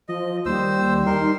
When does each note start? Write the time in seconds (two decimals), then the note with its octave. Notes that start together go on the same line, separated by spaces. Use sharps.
0.09 F3 D#5
0.46 D#2 G3 C5 E6
1.06 D#4 A#4 C6